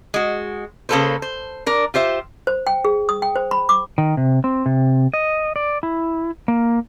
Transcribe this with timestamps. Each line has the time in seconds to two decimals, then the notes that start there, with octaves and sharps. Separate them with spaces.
0.14 G#3 F#4
0.89 C#3 A#3 F#4 A4 B4 C5
1.22 C5
1.66 D4 A#4
1.94 F4 G4 C5 E5
2.47 C5
2.67 G5
2.85 G#4
3.09 D#6
3.22 G5
3.36 C5
3.51 B5
3.69 D6
3.98 D#3
4.17 C3
4.44 C4
4.66 C3
5.14 D#5
5.56 D5
5.83 E4
6.48 A#3